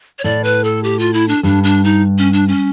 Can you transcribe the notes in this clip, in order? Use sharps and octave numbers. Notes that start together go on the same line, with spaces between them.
C#5
A2 D5
B4
A4
G4
F4
E4
D4
G2 D4
D4
D#4
C#4
D4
C#4